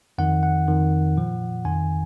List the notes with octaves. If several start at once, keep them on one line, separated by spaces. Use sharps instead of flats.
F2 D#3 F#5
F#5
F2 D#3
A#2 F3
F2 D#3 G#5